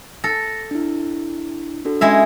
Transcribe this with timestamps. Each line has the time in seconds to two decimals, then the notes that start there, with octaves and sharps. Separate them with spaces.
0.24 A4 A#6
0.71 D4 E4
1.85 D4 F#4 A4
2.01 G#3 C#4 E4 E5